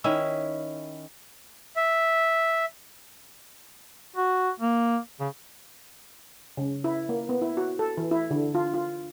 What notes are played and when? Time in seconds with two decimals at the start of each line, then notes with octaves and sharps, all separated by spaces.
0.04 D#3 C#4 E4 E5
1.76 E5
4.16 F#4
4.60 A#3
5.20 C#3
6.57 C#3
6.84 E4
7.09 A#3
7.29 B3
7.42 E4
7.57 F#4
7.79 A4
7.97 E3
8.11 E4
8.30 D3
8.55 F4
8.74 F4